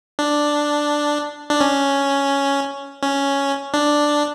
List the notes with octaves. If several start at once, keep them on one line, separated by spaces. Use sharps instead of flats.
D4
D4
C#4
C#4
D4